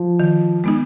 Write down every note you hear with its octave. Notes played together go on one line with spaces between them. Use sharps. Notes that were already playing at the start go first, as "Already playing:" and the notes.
Already playing: F3
D#3
G#3 B3 D#4